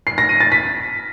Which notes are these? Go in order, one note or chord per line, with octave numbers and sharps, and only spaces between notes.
C7
A#6
D#7
A6
B6